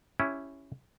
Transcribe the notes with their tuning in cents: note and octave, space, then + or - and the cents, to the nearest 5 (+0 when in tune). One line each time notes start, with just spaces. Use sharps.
C#4 +0 E4 +0 G4 +0